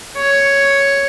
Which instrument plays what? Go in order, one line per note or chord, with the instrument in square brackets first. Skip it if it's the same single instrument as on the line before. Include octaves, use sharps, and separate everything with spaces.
[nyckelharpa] C#5